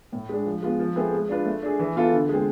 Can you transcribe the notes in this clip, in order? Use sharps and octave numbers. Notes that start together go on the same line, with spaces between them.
A2
G#3 D4
F3
G#3 B3 F4
F3
A3 C4 G#4 B4
G#3
D4 F4 B4
A3
D4 G#4
E3
B3 F4 A4
D3
G#3
C4